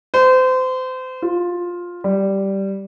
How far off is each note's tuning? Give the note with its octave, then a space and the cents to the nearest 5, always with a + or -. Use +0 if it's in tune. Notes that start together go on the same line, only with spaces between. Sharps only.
C5 -30
F4 +10
G3 -5